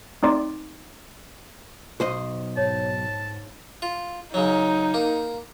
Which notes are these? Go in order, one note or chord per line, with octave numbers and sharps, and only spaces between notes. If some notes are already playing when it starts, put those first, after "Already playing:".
A3 C4 D#4 D5 C6 D6
B1 C5 D#5
G#2 C#5 A5
F4
C#3 F#3 D#4
A#3